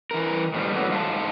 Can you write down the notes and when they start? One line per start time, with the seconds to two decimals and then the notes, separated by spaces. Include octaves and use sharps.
0.11 E3 A#4
0.54 A2 F3 G3
0.72 E2 A2 E3 F#3
0.91 G#2 F4 A4 A5